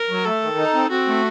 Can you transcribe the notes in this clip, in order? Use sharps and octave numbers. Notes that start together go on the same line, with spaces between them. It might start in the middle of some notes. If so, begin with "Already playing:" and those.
Already playing: A#4
F#3
A3 A4
D#3
D#4
C4
C4 F#4
A3